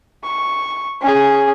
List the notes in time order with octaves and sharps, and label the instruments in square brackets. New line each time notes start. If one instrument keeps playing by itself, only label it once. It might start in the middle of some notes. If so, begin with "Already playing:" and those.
[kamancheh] C#6
C#4 G#4